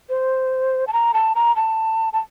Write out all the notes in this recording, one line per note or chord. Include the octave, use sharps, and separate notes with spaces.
C5
A5
A#5
A5
A#5
A5
A5